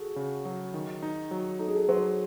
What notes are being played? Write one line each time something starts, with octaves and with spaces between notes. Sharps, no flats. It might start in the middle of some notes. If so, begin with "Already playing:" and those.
Already playing: F#4 G#4 A4
C#3
F#3
D#3
D#4
F#3
D#4 A4
G#4
A4
F#3 C5